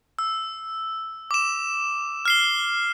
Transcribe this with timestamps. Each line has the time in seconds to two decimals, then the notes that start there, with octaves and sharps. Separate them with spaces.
0.19 E6
1.31 D6 E7
2.25 F6 C7 G7